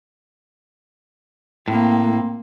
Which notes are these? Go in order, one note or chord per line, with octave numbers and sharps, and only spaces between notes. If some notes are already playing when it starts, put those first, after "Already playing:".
A2 A#3 C4